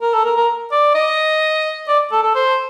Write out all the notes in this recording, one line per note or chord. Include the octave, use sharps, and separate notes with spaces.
A#4
A4
A#4
A#4
D5
D#5
D5
A4
A4
C5